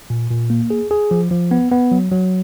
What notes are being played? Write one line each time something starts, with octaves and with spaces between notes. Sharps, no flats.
A#2
A#2
A#3
G#4
G#4
F3
F3
B3
B3
F#3
F#3